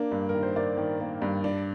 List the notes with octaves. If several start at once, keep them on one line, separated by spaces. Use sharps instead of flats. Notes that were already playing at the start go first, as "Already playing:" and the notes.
Already playing: A#3 D4
G2
A#4
D#3
C5
A#3 D5
D#3
A#3
G2
D4